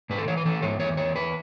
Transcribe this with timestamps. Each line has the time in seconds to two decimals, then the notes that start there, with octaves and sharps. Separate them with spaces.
0.10 G#2 B4
0.18 A4
0.28 E3 C#5
0.37 B4
0.45 E3 A4
0.62 G#2 C#5
0.80 E2 C#5
0.97 E2 C#5
1.15 E2 B4